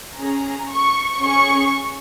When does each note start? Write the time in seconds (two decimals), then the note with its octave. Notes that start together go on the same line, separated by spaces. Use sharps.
0.17 C#4 G#4 A#5
0.70 C#6
1.22 C#4 G#4 C#6